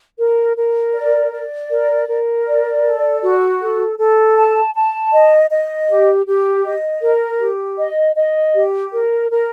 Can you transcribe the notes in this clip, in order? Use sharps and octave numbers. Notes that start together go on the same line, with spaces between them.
A#4
A#4
D5
D5
A#4
A#4
D5
A4
F#4
A4
A4
A5
A5
D#5
D#5
G4
G4
D#5
A#4
G4
D#5
D#5
G4
A#4
A#4